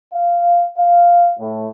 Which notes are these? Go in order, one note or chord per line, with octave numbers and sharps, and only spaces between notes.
F5
F5
A2